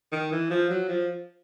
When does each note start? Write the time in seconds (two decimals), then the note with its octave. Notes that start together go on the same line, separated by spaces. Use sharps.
0.12 D#3
0.32 E3
0.50 F3
0.70 F#3
0.88 F3